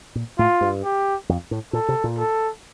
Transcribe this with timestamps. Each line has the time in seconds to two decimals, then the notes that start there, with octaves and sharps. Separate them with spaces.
0.15 A#2
0.39 A2 F4
0.61 G2
0.84 G4
1.29 F2
1.51 A2
1.73 A#2 A4
1.88 C3
2.04 A#2
2.18 A4